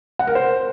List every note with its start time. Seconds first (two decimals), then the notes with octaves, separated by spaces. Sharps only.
0.19 F#5
0.27 A#4
0.35 C5